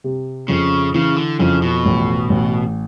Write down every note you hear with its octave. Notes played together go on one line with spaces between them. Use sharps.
C3
F2 C#3
C#3 E3
D3
F2 C#3
B2
A1
A1